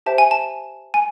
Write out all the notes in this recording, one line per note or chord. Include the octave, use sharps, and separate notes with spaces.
G4 C5 E5 G5 A5
G#5
A5
G#5